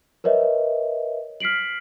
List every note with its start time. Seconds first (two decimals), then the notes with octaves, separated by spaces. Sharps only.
0.24 A#4 B4 C#5 D#5 E5
1.40 F6 B6 C7 D7 F#7